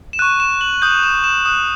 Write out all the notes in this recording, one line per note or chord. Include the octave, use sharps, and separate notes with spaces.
E7
C#6 F#6 D#7
E7
F#7
D#6 G6 F#7
E7
E7
D#6 F#6 E7